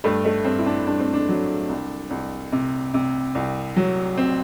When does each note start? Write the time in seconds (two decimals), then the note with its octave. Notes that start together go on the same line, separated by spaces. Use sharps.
0.04 G2 A3
0.25 A3
0.45 G2 C4
0.58 E4
0.66 D4
0.87 G2 D4
0.99 C4
1.13 D4
1.29 F#3
1.69 C2
2.10 C2
2.52 C3
2.94 C3
3.35 C2
3.76 F#3
4.17 C4